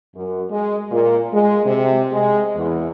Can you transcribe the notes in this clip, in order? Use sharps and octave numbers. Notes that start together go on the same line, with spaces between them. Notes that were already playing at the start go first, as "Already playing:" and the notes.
F#2
G#3
A#2
G#3
C3
G#3
E2